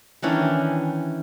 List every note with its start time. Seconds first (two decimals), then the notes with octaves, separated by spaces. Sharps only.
0.22 D#3 E3 C#4 D4